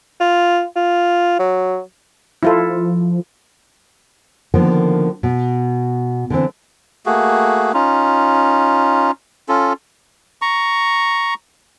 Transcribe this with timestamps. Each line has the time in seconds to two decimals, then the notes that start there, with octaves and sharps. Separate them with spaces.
0.20 F4
0.76 F4
1.39 F#3
2.43 F3 E4 F4 A4
4.54 D3 D#3 F3 A#3 B3
5.23 B2
6.30 D3 E3 C4
7.06 A3 A#3 F#4 G#4
7.74 C#4 D#4 F4
9.49 C#4 F4 A4
10.42 A#5 C#6